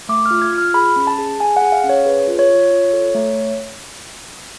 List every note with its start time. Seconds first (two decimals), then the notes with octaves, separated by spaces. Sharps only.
0.09 A3 D6
0.26 F6
0.31 F4
0.42 G#6
0.53 F4
0.58 F6
0.74 G#4 B5
0.96 C#4
1.07 A5
1.18 G#4
1.40 G#4 G#5
1.56 F#5
1.62 G#4
1.72 F5
1.84 C#4
1.89 C#5
2.06 G#4 B4
2.28 F4
2.39 C#5
2.50 F4
2.72 F4
2.93 A4
3.15 A3